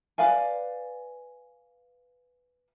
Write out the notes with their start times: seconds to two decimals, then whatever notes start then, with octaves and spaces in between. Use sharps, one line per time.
0.18 B4 D5 F5 G#5